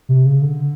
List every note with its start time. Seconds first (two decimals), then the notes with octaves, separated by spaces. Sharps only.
0.09 C3
0.26 C#3
0.42 D3